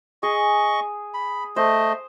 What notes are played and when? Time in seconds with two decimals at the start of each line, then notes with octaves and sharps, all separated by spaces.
0.23 G#4 D#5 C#6
1.14 B5
1.56 A3 C5 D#5